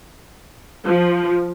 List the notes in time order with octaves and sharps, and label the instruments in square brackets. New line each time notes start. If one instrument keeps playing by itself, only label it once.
[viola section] F3